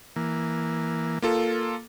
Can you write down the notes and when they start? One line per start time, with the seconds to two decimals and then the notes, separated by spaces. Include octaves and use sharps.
0.16 E3 A#3
1.22 A#3 F4 A4